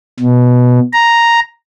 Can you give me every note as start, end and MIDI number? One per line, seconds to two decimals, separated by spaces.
0.19 0.79 47
0.93 1.40 82